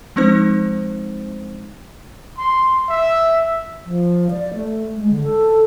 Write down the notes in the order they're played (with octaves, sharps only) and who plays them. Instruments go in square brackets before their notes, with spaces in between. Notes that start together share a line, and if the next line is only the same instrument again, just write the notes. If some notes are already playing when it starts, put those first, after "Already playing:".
[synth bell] F3 G#3 C4 D#4 C5
[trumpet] C6
E5
[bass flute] F3
D5
A3
G#3
D3
A4